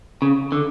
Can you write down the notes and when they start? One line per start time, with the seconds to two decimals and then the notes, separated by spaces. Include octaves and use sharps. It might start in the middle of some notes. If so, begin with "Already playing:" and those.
0.22 C#3
0.52 D3